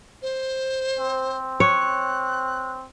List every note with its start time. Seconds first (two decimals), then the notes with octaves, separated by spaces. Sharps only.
0.22 C5
0.99 C4
1.60 C#5 F#6